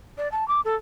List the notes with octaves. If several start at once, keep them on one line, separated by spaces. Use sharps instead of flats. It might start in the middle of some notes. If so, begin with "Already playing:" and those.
D5
A5
D6
A4